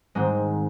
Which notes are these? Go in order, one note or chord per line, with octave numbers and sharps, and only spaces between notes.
G#2 D#3 G#3 C4